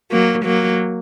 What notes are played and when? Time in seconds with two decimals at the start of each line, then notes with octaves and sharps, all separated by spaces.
0.11 F#3 A#3
0.45 F#3 A#3